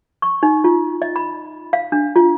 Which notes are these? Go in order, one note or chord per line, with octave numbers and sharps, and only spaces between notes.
C#6
D#4
F4
D#5
B5
F5
D4
F4